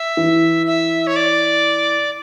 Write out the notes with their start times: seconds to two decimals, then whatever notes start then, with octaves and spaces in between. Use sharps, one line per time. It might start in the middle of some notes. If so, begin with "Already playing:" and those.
Already playing: E5
0.17 E3
0.67 E5
1.07 C#5
1.16 D5